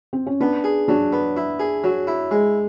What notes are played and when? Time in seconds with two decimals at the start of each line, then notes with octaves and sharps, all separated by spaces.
0.13 C4
0.27 C#4
0.40 B3 D4
0.64 G#4
0.88 F#3 D4
1.13 B3
1.36 E4
1.59 G#4
1.84 F#3
2.07 E4
2.31 G#3